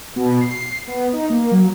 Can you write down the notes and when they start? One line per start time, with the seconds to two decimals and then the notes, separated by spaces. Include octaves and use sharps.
0.16 B2
0.41 C7
0.87 B3
1.13 D#4
1.30 A#3
1.51 F#3